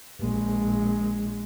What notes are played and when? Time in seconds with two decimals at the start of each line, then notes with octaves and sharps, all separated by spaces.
0.20 A#1 G#3